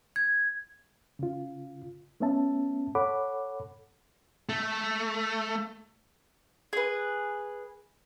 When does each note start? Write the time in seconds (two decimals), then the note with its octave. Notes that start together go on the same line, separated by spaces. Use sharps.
0.16 G#6
1.19 C#3 F4
2.20 A3 B3 C#4 E5 A5
2.95 A4 C#5 F#5 B5 D6
4.49 A3
6.73 G#4 B4